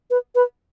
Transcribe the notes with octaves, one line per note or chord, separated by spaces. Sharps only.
B4
B4